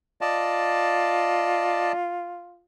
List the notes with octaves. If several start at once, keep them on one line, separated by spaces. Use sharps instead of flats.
F4 D5 D#5 A5